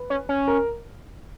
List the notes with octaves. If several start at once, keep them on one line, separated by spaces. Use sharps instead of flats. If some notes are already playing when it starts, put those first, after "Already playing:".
Already playing: B4
C#4
C#4
A#4